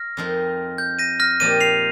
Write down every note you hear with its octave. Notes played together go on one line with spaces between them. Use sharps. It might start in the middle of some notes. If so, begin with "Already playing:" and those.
Already playing: F6 A#6
F2 F3 C4 D#4 A#4
G6
A#6 D#7
F6 A#6
A#2 F3 A#3 D#4 G4 A#6 D#7
C7 F7